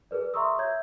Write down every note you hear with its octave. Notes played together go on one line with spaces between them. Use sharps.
G#4 A#4 B4 D5
E5 A#5 C6 C#6 D#6 E6
C#5 E5 G6 G#6